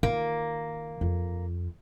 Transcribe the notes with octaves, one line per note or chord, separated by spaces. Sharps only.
D#3 A#3 F4
F2